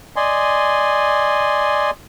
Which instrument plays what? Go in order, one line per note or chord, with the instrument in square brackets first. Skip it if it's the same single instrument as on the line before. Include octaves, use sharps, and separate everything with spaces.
[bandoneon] D5 D#5 G#5 C6